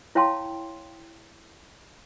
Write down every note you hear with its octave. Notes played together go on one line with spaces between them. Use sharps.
E4 C#5 F5 G5 A5 C6